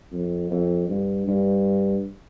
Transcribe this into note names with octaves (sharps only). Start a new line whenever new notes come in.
F2
F2
G2
G2